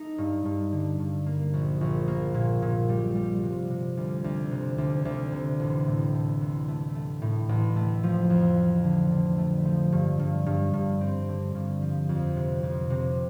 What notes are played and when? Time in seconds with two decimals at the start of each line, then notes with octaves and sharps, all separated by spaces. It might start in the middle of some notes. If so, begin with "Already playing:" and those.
Already playing: A3 D#4
0.18 G2
0.45 G2
0.72 D3
0.99 G2
1.26 A#3
1.54 A#1
1.81 A#1
2.08 A#3
2.34 A#2
2.62 A#2
2.89 G3
3.16 G3
3.43 C3
3.70 C3
3.97 D2
4.24 D2
4.51 C3
4.78 D2
5.05 D2
5.32 C3
5.60 A1
5.87 A2
6.14 A3
6.41 A1
6.68 A3
6.95 A3
7.22 A2
7.49 A1
7.76 A3
8.03 F3
8.30 F2
8.57 F3
8.84 D3
9.11 D3
9.38 A3
9.65 F3
9.92 G2
10.19 G2
10.46 G2
10.74 G2
11.01 C4
11.28 D3
11.55 G2
11.82 F3
12.09 F2
12.36 C3
12.63 F2
12.90 C3